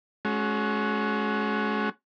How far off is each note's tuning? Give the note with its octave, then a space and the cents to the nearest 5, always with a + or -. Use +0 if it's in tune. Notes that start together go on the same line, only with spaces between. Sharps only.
G#3 +35 C#4 +0 F#4 +0